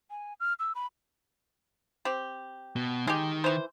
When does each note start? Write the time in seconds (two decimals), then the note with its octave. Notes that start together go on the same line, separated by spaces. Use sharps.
0.10 G#5
0.40 F6
0.59 E6
0.75 B5
2.05 C4 G4
2.76 B2
3.07 D#3 G#3 G4
3.44 E3 C5